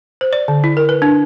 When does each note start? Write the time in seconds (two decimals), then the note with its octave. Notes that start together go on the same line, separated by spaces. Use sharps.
0.21 C5
0.33 D5
0.48 D3
0.64 E4
0.77 A#4
0.89 B4
1.02 D4